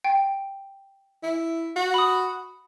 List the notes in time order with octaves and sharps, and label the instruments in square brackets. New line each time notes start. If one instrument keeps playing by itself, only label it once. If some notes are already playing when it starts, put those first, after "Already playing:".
[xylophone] G5
[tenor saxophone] E4
F#4
[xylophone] B5 D#6